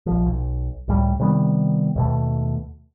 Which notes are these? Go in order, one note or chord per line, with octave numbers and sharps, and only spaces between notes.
A#1 F3
B1
C#2 A2 G3
C3 D#3 G3 B3
D#2 B2 A3